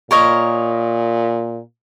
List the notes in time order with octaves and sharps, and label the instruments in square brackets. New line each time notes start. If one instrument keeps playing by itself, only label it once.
[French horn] A#2 [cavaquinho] A#4 C#5 D#5